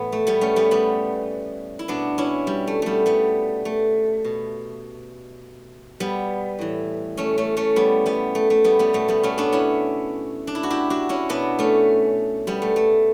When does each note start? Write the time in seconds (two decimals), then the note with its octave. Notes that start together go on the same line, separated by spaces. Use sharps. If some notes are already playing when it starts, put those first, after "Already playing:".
Already playing: A2 E3 B3
0.12 A3
0.27 G3 B3
0.41 A3 C#4
0.56 G3 B3
0.71 G3 B3
1.79 E4
1.88 B2 B3 D4
2.18 C#4 E4
2.47 G3
2.67 A3
2.82 G3 A3 B3
3.06 G3 B3
3.65 A3
4.24 B2
6.00 G3 B3
6.59 A2 E3
7.17 A3 C#4
7.38 A3 C#4
7.57 A3 C#4
7.76 G3 B3
8.06 G3 B3
8.35 A3
8.50 A3
8.64 G3 B3
8.79 G3 B3
8.93 B2 A3
9.08 G3 B3
9.23 A3 C#4
9.38 B3 D4
9.52 C#4 E4
10.47 D4
10.55 E4
10.63 F#4
10.70 E4 G4
10.90 D4 F#4
11.09 C#4 E4
11.29 B2 B3 D4
11.59 A3 C#4
12.47 G3 B3
12.62 A3
12.76 A3